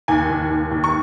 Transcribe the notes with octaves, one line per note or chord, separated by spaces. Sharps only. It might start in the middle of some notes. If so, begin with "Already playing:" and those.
D#2 G#5
D#2
D#2
D#2
C#6